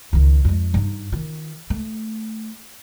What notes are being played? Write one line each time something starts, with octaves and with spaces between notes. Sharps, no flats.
C#2 D#3
F2 G#3
G2 D#4
D#3 F4
A3